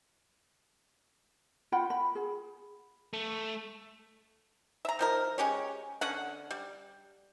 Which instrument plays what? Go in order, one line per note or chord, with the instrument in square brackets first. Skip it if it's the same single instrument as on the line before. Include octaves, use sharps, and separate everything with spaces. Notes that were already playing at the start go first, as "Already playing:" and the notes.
[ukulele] F4 F#5 G5 B5
B5
G#4
[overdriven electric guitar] A3
[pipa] E5 A#5
D#3 F3 A#4
G#3 C#4 G4 C#5
D3 C#4 F#5
G3